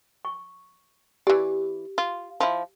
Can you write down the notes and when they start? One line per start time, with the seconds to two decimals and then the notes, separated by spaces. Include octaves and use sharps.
0.25 C#6
1.27 E3 G4 D5
1.98 F4
2.40 F3 E4